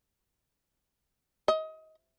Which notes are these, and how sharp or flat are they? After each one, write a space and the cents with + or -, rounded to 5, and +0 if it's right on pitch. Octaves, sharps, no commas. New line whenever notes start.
D#5 +25